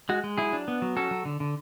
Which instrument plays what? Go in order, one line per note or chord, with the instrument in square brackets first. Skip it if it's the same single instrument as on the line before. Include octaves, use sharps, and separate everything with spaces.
[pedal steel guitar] G#3 F#4
G#3
F#3 E4 G#4
D4
B3
F#3
C#4 F#4 A4
F#3
D3
D3